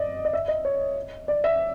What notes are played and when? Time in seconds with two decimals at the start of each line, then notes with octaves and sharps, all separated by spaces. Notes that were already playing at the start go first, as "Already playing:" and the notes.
Already playing: D5 D#5
0.25 D#5
0.33 E5
0.48 D#5
0.65 C#5
1.28 D5
1.44 E5